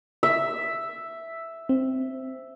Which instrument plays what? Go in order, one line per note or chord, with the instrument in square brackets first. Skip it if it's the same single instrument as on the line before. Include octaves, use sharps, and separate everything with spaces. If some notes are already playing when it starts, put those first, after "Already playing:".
[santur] E5
[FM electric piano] C4